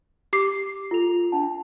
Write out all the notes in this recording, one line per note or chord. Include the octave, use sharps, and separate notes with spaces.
G4 D6 C7
F4 A4 F7
D4 F#5 A5